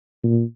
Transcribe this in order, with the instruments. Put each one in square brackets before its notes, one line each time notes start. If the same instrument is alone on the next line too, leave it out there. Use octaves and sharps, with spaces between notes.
[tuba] A#2